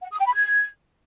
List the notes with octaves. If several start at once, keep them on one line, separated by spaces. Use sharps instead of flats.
F#5
D#6
G5
B5
G#6